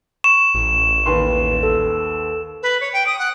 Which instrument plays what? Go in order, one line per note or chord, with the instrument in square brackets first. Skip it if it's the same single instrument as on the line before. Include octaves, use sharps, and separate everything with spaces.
[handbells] C#6 [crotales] E7
[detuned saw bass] A1
[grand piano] D#2 B4 C6
[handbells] A4
[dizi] B4
C#5
G5
D#6
F#5